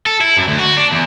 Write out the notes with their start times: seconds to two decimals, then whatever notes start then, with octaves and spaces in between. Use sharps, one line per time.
0.06 A4
0.21 E4
0.37 F#2
0.48 D2
0.60 F#4
0.78 D4
0.92 E2